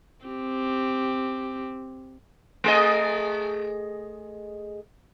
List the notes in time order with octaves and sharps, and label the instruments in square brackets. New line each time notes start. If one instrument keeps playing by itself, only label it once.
[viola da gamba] C4 G4
[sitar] A3 G#4 D#5